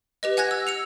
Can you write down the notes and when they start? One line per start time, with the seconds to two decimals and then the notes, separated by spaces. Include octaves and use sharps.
0.23 G4 B4 D#5
0.37 F#5 G#5 F#6 G#6 A#6
0.51 E6
0.67 E6 C#7 F7